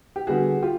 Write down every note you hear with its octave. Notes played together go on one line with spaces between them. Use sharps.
G4
D3 G3 B3 F#4 G#4
F4 G4